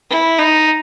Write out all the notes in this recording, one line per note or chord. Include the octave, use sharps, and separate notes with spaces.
E4
D#4